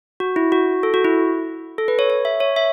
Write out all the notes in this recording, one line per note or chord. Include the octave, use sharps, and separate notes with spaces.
F#4
E4
F#4
A4
F#4
E4
A4
B4
C#5
C#5
E5
C#5
E5